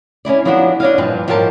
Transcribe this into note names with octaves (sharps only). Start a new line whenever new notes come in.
C#4 D#4 E4 D5
F3 F#3 B3 D4 E4 F#4
D4 C#5 D#5 F5
G2 A#2 F3 B4
G#2 F3 F#3 G4 A#4 A5